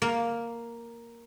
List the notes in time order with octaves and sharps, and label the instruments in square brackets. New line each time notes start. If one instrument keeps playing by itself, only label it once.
[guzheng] A#3